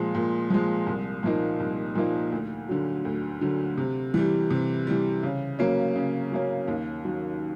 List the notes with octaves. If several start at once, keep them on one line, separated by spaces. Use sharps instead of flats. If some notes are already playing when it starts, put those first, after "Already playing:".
Already playing: A#2 F3 G#3
A#2
F3 G#3
C2
A#2 F3 A#3 D#4
C2
A#2 F3 A#3 D#4
D2
D3 F#3
D2
D3 F#3
C3
E3 G3
C3
E3 G3
C#3
F#3 A#3 C#4
C#3
F#3 A#3 C#4
D#2
D#3 F#3